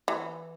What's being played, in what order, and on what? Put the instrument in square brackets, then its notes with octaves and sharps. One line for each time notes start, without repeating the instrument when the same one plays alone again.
[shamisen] E3